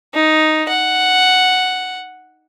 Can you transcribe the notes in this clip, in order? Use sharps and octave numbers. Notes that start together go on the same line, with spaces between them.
D#4
F#5